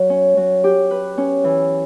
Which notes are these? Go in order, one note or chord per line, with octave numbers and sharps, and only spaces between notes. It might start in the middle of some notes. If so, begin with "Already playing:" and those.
Already playing: F#3
C#4
F#3
G4
B4
C#4
E3